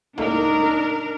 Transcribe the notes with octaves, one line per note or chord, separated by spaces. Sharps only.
C#2 A2 A#3 D4 D#4 A#4